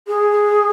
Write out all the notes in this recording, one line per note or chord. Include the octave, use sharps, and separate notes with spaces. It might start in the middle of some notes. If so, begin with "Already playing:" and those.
G#4